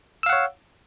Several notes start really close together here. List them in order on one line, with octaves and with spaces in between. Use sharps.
E6 F5 F#5 C#5